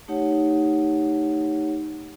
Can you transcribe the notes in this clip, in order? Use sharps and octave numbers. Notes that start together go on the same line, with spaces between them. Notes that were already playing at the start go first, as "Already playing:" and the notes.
A3 D#4 G4 C#5 F#5